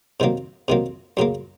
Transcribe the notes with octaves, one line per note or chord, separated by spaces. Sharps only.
C3 D#3 F#3 A#3
C3 D#3 F#3 A#3
F#2 C#3 F#3 A#3